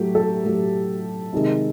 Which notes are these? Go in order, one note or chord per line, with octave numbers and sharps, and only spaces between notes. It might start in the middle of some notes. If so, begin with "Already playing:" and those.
Already playing: A2 F#3 A3 G4
A4
A2 F#3 A3
C3 D#3 G#3